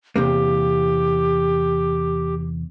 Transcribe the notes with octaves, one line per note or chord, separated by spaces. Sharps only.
E2 C3 A#3 G4